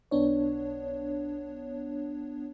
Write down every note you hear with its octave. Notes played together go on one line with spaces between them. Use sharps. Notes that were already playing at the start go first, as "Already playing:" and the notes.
B1 B3 D4 C#5